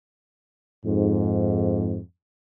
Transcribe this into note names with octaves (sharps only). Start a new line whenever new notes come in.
F2 G#2